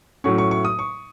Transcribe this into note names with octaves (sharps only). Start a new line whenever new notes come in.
A2 F#3 A3 C#4 C#6
C#6
C#6
D#6
C#6